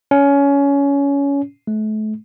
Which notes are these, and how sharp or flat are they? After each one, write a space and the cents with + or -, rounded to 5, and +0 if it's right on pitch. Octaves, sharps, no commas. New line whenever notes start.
C#4 +20
A3 -35